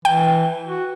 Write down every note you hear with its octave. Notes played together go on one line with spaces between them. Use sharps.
E3 G5
F#4